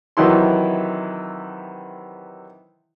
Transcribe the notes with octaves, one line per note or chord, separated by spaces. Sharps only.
C3 D#3 E3 F#3 E4 C6